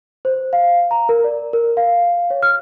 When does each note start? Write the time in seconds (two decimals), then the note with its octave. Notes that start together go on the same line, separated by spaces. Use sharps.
0.25 C5
0.53 F5
0.91 A#5
1.09 A#4
1.24 D5
1.53 A#4
1.77 F5
2.30 C#5
2.43 F6